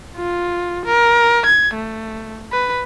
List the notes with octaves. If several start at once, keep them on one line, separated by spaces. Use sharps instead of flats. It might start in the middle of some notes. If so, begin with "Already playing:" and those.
F4
A#4
G#6
A3
B4